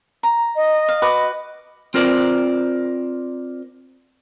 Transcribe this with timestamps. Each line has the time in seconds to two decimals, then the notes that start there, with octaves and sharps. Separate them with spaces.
0.23 A#5
0.56 D#5
0.89 F5
1.02 F#4 B4 D6
1.94 C4 F4 A#4 C5 D5